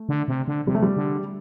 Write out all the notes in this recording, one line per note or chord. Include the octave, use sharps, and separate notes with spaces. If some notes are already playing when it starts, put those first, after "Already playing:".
Already playing: A3
D3
C3
D3
C3 G3
A3
G3
D3